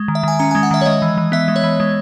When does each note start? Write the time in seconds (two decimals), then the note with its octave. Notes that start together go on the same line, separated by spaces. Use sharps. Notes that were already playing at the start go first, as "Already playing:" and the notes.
Already playing: G#3
0.08 D#3
0.15 E5
0.23 D#3 G#5
0.39 C#4 A#5
0.51 G#5
0.55 G#3
0.63 F#5
0.71 D#3 E5
0.81 C#5
0.85 G#3 D#5
1.02 E3
1.18 E3
1.32 B3 E5
1.48 G#3
1.56 C#5
1.64 E3
1.80 G#3